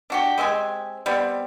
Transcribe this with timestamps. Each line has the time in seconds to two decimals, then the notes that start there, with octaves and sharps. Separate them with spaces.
0.10 D4 F#4 G4
0.38 G#3 C4 G4 G#5
1.06 G3 B3 C4